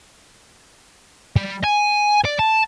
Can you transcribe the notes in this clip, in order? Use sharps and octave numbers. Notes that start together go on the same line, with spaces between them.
G3
G#5
D5
A5